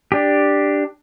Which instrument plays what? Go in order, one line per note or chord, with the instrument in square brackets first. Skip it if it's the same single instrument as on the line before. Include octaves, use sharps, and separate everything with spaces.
[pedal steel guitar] D4 G4